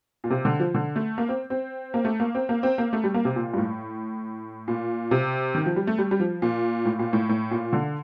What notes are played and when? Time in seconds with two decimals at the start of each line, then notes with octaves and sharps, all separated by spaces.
0.24 A#2
0.30 C3
0.45 D3
0.60 F3
0.75 D3
0.96 A3
1.18 A#3
1.29 C4
1.50 C4
1.94 A#3
2.05 A3
2.20 A#3
2.35 C4
2.49 A#3
2.63 C4
2.78 A#3
2.93 A3
3.04 G3
3.14 A#3
3.25 C3
3.36 A#2
3.53 G2
3.58 A2
4.68 A#2
5.11 C3
5.55 D#3
5.66 F3
5.76 G3
5.87 A3
5.98 G3
6.11 G3
6.20 F3
6.42 A#2
6.85 A2
6.99 A#2
7.13 A2
7.29 A2
7.51 A#2
7.73 D3